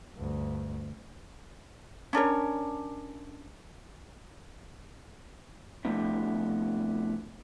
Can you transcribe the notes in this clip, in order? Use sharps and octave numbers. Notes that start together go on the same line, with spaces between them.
D2 G2
C#4 D4 A#4 C#5
C3 F3 A3 B3 D4 E4